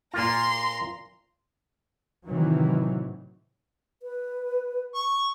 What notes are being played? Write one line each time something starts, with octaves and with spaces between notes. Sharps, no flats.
A#2 A#3 F4 A#5 C6
A2 C3 D#3 E3 F#3
B4
C#6